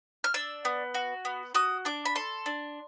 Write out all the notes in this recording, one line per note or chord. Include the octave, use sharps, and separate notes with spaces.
F6
D4 E6
B3
F#4
B3
F#4 D#6
D4 D6
B5
A4 C6
D4